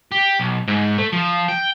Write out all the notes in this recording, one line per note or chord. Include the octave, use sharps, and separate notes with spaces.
G4
B1
G#2
A3
F3
G5